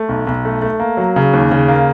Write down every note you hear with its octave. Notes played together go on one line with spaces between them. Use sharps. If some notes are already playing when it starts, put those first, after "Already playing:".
Already playing: A3
B1
B1
A3
A3
A#3
F#3
C#3
D#2
C#3
A#3